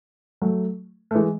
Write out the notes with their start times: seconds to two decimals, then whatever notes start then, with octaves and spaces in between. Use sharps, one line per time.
0.42 F#3 A3
1.11 A3
1.15 E3 G#3